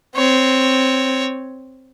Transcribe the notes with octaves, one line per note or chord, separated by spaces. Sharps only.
C4 C#5